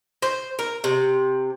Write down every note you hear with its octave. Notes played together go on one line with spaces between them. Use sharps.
C5
A#4
C3